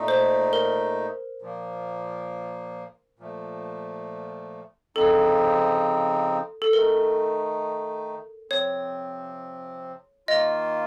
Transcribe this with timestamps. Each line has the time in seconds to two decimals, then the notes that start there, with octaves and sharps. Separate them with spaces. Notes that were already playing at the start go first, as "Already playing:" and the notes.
Already playing: A#2 A3 D#4
0.08 C5
0.53 A#4
1.42 A#2 F3 A#3
3.19 A#2 F3 A3
4.96 C#3 F3 C4 D#4 A4
6.62 A4
6.73 D#3 A3 D#4 A#4
8.50 C3 F3 C4 C#5
10.28 D#3 A#3 F4 D#5